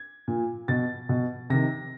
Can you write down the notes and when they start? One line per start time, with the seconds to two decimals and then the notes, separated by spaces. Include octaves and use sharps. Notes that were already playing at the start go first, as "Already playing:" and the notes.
Already playing: G#6
0.28 A#2
0.68 B2 A6
1.09 B2
1.50 C3 D#3 A#6